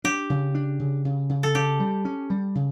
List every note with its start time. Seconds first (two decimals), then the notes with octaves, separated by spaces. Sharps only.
0.04 D4 G4
0.30 C#3
0.55 D4
0.80 C#3
1.05 C#3
1.29 C#3
1.43 A4
1.55 C#3 G4
1.80 G3
2.05 C#4
2.30 G3
2.55 C#3